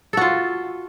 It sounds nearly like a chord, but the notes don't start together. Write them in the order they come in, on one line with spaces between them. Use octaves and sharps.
A4 F#4 F4